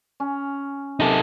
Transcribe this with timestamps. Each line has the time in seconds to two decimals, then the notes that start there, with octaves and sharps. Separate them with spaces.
0.20 C#4
1.00 C3 A#3 D#4 G#4 A4